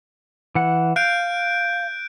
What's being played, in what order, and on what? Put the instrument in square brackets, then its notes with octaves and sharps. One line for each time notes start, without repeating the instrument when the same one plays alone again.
[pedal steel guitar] E3 F#5
[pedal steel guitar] F5 [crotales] F#6 G6 D7